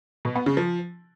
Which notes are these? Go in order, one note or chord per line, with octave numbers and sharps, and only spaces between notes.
B2
B3
C#3
F3